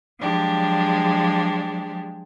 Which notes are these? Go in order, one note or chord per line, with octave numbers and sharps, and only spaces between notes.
F3 F#3 G#3 D4 G4